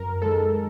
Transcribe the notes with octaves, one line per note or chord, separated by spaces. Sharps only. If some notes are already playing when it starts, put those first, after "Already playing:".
Already playing: F#2 A#4
D#3 G#3 A4